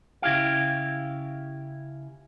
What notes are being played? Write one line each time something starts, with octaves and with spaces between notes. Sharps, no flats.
C#3 E4 G4 F5